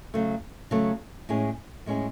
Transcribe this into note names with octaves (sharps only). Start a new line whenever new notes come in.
C#3 F#3 A3
C#3 F#3 A3
A2 G#3 C#4 G#4
A2 G#3 C#4 G#4